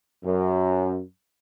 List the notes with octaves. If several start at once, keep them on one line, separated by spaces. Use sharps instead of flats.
F#2